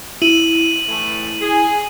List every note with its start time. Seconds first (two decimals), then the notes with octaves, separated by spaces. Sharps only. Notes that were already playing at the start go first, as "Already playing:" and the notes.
0.22 E4 D#7 F#7
0.88 A2 E3 A3
1.41 G#4